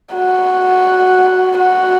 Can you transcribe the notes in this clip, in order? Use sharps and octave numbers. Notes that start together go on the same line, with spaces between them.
F#4
F#4